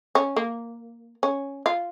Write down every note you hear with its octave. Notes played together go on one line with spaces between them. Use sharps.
C#4
A#3
C#4
F4